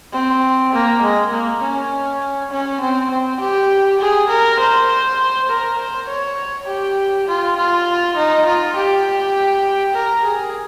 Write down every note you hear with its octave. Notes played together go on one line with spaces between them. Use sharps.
C4
A#3
G#3
A#3
C#4
C#4
C4
C4
G4
G#4
A#4
C5
A#4
C5
C#5
G4
F4
F4
D#4
F4
G4
A#4
G#4